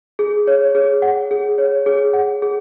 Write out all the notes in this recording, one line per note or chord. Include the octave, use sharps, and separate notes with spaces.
G#4
C#5
G#4
F#5
G#4
C#5
G#4
F#5
G#4